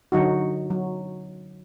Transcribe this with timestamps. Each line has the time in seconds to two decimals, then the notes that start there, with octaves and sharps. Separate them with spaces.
0.12 D3 F#3 D#4 F#4
0.70 F#3